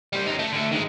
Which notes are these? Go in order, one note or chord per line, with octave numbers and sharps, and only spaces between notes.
G3 C5
F#2 D#4
A3
D3 A3
D#3 G#3